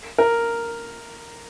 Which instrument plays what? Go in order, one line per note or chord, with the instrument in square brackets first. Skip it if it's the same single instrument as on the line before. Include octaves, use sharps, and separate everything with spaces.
[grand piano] A#4